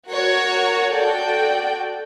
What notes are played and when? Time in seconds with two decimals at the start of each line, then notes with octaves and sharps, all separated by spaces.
0.10 F#4 A#4 C#5
0.93 F#4 A4 D5 G5